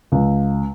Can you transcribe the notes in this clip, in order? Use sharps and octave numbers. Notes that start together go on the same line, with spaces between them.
C#2